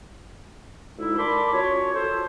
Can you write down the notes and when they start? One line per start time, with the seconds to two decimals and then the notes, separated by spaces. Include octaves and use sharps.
0.98 D2 G#3 D#4 E4
1.18 A#4 D5 A5 B5 C6 D6
1.53 C#4 F4 F#4 C#5
1.95 A4 C5